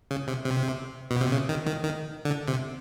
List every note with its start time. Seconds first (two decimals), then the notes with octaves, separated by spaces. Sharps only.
0.11 C#3
0.28 C3
0.45 C3
1.11 B2
1.21 C3
1.32 C#3
1.49 D#3
1.67 D#3
1.84 D#3
2.25 D3
2.48 C3